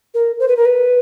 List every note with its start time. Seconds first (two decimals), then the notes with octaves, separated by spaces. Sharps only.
0.14 A#4
0.39 C5
0.48 B4
0.57 A#4
0.65 B4